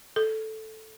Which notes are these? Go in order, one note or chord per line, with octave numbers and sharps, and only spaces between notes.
A4